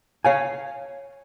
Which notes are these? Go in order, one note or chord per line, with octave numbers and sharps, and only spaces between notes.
C#5 F5 G#5